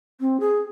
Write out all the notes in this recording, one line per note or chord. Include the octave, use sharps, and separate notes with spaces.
C4
G#4